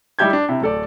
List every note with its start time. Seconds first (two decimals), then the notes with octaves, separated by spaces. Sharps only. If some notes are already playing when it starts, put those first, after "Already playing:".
0.19 G3 D#4 E4 G4 G6 G#6
0.33 D4
0.49 C3 E4
0.62 D1 A4 D5